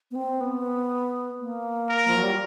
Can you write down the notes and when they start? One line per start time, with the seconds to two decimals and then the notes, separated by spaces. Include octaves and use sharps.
0.11 B3
0.15 C4
0.41 B3
1.40 A#3
1.89 A#4
2.08 F3
2.16 F#3
2.23 G3